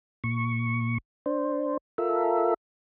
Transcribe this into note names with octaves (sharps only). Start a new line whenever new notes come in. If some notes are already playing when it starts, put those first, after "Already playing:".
A#2 C#6
D4 C5
F4 A4 A#4 E5